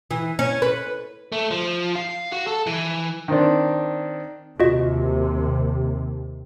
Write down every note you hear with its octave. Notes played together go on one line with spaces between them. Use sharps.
E3
C#4
B4
A3
F3
F5
F#4
A4
E3
D#3 C4 D4
D#2 C3 F4 F#4 D#5